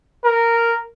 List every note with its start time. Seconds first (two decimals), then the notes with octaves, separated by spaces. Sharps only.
0.25 A#4